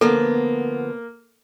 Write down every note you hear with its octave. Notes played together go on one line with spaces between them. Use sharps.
D3 F3 A#3 B3 A4